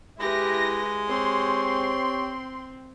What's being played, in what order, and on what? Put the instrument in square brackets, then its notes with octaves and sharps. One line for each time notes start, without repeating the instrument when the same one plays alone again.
[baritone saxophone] G#3 [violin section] E4 A#6 [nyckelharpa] G4 B4
[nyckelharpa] C4 [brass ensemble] G4 C5 C#5 [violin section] G5 C6